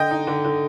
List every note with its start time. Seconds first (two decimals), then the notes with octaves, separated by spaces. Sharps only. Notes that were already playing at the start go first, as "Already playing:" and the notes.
Already playing: D3 D#5 G5
0.11 D#4
0.27 D3
0.45 D3